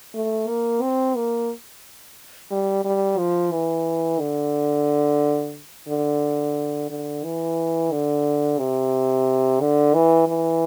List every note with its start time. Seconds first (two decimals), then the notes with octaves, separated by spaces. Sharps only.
0.14 A3
0.48 A#3
0.82 C4
1.15 A#3
2.51 G3
2.84 G3
3.18 F3
3.52 E3
4.20 D3
5.89 D3
6.90 D3
7.24 E3
7.91 D3
8.59 C3
9.60 D3
9.94 E3
10.28 E3